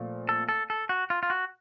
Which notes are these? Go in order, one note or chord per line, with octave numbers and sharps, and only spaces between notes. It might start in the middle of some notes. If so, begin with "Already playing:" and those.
Already playing: A#2 F3 A3 C4
A4
A4
A4
F#4
F4
F4
F#4